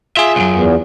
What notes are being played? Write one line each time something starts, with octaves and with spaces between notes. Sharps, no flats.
F4 G#4 E5
C2 F#2
E2